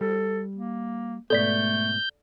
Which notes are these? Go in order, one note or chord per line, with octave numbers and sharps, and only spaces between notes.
G3 A4
A#3
G#2 B2 A3 B3 A4 D5 G6 B6